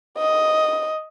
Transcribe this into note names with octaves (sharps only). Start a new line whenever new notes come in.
D#5